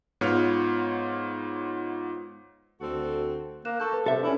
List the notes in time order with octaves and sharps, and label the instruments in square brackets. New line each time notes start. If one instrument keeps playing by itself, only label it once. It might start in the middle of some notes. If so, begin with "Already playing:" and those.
[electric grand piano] G#2 B3 F4 C#5 F6
[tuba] D2 [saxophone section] C4 F#4 [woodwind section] A4
[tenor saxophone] A#3 [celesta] F#6 E7
[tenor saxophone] A4 [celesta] A5 C#6 G6
[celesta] B4
[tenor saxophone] C3 [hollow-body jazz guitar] A4 E5
[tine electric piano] C#4 D4 [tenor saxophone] E4